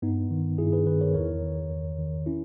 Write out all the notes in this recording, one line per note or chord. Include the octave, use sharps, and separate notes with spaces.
G2 B3 D#4
D#3
G2 E4 G#4
G#4 B4
D#3 G#4 B4
A#4 C#5
E2 A#4 C#5
D#3
E2
D#3
C#4 E4